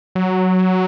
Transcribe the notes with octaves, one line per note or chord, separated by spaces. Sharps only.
F#3